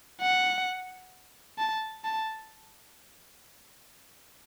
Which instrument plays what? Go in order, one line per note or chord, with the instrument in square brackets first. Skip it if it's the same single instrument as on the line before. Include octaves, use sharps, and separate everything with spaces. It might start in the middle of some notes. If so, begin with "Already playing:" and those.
[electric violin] F#5
A5
A5